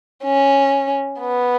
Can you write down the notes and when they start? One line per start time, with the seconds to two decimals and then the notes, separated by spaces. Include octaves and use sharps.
0.24 C#4
1.20 B3